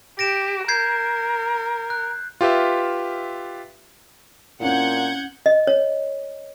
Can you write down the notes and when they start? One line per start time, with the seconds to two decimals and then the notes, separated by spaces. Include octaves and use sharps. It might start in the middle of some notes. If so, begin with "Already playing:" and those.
0.19 G4 A#6 D7 E7
0.68 A#4 G6 G#6 C7
1.90 F#6
2.41 F4 G4 B4 E5
4.61 A#2 C4 C#4 E4 F#5 G6 G#6
5.46 D#5
5.67 C#5